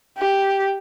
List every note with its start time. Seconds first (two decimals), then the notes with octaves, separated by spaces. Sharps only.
0.18 G4